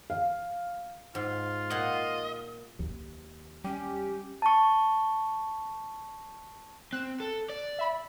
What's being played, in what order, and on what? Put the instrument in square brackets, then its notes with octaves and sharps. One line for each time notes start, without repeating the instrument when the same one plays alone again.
[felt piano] F5
[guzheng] G#2 [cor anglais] F4
[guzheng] A#2 F#5 [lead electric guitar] D#5
[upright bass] D#2
[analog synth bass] G3 [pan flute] C#4 [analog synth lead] G4
[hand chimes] A5 C#6
[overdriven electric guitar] C4 [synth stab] F#6 E7
[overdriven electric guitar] A4
D5
[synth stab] E5 B5